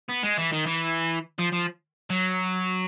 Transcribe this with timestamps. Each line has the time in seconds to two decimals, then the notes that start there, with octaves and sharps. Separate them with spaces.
0.09 B3
0.23 G#3
0.38 E3
0.52 D#3
0.66 E3
1.39 F3
1.52 F3
2.10 F#3